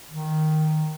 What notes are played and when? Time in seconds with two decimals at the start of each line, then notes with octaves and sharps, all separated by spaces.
0.08 D#3